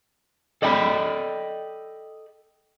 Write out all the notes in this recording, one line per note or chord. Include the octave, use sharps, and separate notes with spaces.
A4 D5 D#5 G5 G#5 B5